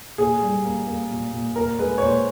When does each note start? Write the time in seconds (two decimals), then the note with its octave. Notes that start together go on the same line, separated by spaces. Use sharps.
0.18 A#2 G#4
0.42 G3
0.64 A#3
0.87 A#3
1.11 A#2
1.33 A#2
1.56 A#2 A#4
1.79 G#3 B4
1.98 C#5
2.02 A#2 C5